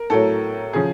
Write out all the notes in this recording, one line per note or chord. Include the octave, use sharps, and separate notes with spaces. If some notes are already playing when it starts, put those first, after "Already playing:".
Already playing: A#4
A2 F#3 A4
C#3 F3 G#4